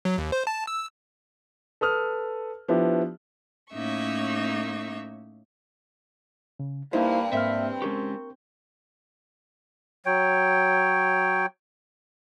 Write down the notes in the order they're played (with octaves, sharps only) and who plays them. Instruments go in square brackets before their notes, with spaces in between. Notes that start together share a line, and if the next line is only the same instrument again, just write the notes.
[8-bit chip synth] F#3
D#2
C5
A5
E6
[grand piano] A4 B4 D#6 F6
F3 B3 D4 E4 G4
[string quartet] A2 A#3 C#4 D#4 E5 C#6
[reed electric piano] C#3
[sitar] G2 [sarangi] A#3 [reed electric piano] D#4 E4 C5
[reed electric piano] G#2 A#3 F6 [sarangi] C4 [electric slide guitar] E5
[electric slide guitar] G#3 C#4 G4 [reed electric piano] A#4 C#6
[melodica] F#3 C#5 G5